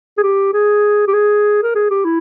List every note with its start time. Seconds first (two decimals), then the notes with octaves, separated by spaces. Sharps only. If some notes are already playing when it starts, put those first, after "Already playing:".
0.18 G#4
0.23 G4
0.53 G#4
1.07 G4
1.13 G#4
1.63 A#4
1.75 G#4
1.90 G4
2.05 E4